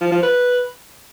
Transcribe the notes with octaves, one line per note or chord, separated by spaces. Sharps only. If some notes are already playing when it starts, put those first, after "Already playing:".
F3
F3
B4